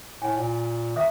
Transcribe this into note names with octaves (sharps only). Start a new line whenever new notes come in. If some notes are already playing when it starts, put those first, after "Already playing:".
A2 G#5
A#2
D#3 E5 D#6